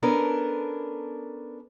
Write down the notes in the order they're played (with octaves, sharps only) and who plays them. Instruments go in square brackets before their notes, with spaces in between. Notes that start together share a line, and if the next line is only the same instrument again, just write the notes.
[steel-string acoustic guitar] B3 C#4 D4 A4 A#4